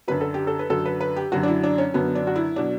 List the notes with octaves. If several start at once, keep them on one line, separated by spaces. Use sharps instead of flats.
F#2 D3 F#3 B4
A4
G4
A4
B4
F#2 D3 F#3 A4
B4
B4
G4
F#2 D3 F#3 F#4
D4
E4
D4
C#4
F#2 D3 F#3 B3
D4
F#4
E4
B2 F#3 D4